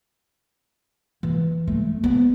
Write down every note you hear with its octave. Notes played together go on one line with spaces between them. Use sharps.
E3
A3
B3